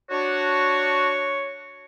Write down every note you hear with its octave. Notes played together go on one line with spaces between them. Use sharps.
D4 F#4 C#5